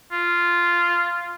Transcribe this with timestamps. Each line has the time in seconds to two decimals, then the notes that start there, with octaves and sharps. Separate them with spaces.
0.12 F4